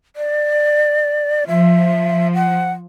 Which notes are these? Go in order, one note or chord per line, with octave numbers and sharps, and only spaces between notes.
D5
F3 E5
F#5